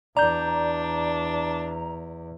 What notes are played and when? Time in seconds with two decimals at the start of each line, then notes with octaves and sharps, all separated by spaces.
0.17 E2 D4 D5 A#5 G6